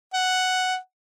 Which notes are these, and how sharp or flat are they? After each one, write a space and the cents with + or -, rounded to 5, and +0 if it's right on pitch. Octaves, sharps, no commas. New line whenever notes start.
F#5 +0